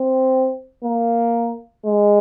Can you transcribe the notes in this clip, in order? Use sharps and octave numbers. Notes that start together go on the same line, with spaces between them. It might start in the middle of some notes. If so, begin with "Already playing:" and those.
Already playing: C4
A#3
G#3